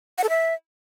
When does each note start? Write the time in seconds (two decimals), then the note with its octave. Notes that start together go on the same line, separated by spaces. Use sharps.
0.18 F#5
0.24 A4
0.29 E5